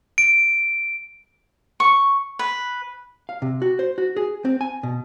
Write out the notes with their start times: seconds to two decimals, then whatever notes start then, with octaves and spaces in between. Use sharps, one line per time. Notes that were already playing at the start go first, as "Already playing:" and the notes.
0.18 D7
1.80 C#6
2.39 B4
3.29 F5
3.42 C3
3.62 F#4
3.79 C5
3.98 F#4
4.17 G#4
4.45 C4
4.61 G#5
4.83 B2